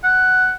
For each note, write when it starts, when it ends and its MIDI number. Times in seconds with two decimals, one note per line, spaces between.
0.03 0.52 78